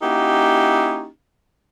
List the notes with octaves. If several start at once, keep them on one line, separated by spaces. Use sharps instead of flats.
A#3 C#4 D#4 E4 F#4 G4